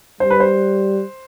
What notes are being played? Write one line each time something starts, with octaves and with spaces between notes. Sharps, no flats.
G3 C5
B4
C5